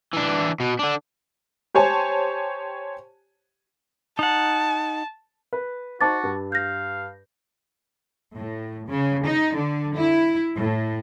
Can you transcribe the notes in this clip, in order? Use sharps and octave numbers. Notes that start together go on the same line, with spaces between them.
E3 D4
B2
D3 D4
G4 C5 C#5 G#5 A5
D#4 F#5 A5
B4
D#4 F#4 C5 A5 C#6 D6 A6
G2
F5 G6 A#6
A2
C#3
D#4
D3
E4
A2